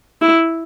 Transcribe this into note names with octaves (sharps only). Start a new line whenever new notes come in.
E4